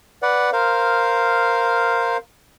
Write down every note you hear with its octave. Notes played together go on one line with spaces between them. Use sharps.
B4 D5 F#5
A#4 C5 F5